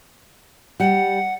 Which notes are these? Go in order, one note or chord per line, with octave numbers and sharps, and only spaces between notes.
G3 F#5